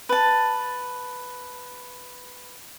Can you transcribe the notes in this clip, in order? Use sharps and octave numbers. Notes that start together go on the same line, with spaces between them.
B4 A5